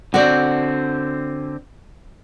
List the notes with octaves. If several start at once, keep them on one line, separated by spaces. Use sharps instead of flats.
D3 C4 F#4 D5